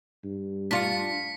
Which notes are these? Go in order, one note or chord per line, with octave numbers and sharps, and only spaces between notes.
G2
D4 F4 B6 C#7